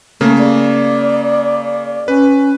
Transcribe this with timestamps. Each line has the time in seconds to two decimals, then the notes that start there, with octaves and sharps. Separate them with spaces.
0.21 C#3 A3 A#3
0.38 D5
2.08 C#4 B4